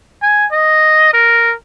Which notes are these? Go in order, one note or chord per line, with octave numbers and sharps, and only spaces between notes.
G#5
D#5
A#4